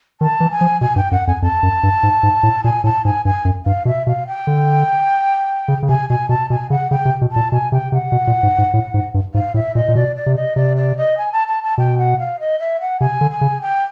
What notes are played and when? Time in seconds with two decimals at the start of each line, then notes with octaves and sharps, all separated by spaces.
0.20 D#3 A5
0.40 E3
0.51 G#5
0.61 F3
0.81 B2 G#5
0.96 G2 G5
1.11 F#2 F#5
1.27 F2 G#5
1.42 F2 A5
1.63 F#2
1.83 G2
2.03 G#2
2.23 G#2
2.43 A2
2.64 A#2 G#5
2.84 A2 A5
3.05 G#2 G#5
3.25 G2 G#5
3.45 F#2
3.65 G2 F5
3.85 B2 E5
4.07 B2 F5
4.27 G5
4.47 D3
5.68 C#3
5.83 C#3
5.89 C3 G#5
6.09 B2 G#5
6.29 B2 A5
6.50 B2 G#5
6.70 C#3 F#5
6.91 C#3 G5
7.05 C3
7.21 B2
7.31 A#2 A5
7.52 B2 G#5
7.72 C3 G5
7.92 C3 F#5
8.12 B2
8.27 A#2
8.43 G#2
8.58 G#2
8.73 A2
8.94 G#2
9.14 G2
9.34 G#2 F5
9.54 A2 E5
9.75 A#2 D#5
9.88 A#2
9.95 B2 D5
10.16 D5
10.26 C3
10.35 D#5
10.56 C3 D5
10.76 D5
10.97 D#5
11.17 G#5
11.32 A5
11.48 A5
11.63 A5
11.78 B2 G5
11.98 F#5
12.19 F5
12.39 D#5
12.59 E5
12.80 F#5
13.00 C3 G#5
13.21 D3
13.30 G#5
13.41 C#3
13.61 G5